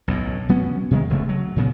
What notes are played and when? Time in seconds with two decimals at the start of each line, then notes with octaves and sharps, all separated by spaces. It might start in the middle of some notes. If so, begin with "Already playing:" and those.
0.08 B1 F#2 A2
0.49 F#3 B3 C#4
0.91 C3 D#3 F#3 G#3
1.10 E1 C#3 A3
1.29 F#3
1.56 A#2 C#3 B3